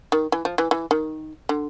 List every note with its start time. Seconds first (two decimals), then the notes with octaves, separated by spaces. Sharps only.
0.12 D#3
0.32 E3
0.45 F3
0.58 E3
0.71 E3
0.91 D#3
1.49 D3